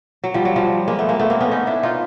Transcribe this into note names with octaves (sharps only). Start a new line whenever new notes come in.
F#3
F3 G3
F#3
F3 G3
G#3 A#3
A3 B3
G#3 A#3
A3 B3
A#3 C4
B3 C#4
C#4 D#4
D4 E4
D#4 F4